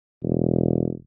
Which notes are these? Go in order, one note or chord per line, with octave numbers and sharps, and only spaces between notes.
E1